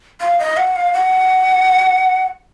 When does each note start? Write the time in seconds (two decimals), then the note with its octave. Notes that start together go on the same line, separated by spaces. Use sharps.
0.21 F5
0.39 D#5
0.57 F#5
0.76 F5
0.94 F#5